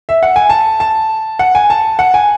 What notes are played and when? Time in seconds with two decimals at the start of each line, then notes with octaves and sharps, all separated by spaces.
0.09 E5
0.23 F#5
0.36 G#5
0.49 A5
0.80 A5
1.39 F#5
1.55 G#5
1.70 A5
1.99 F#5
2.14 G#5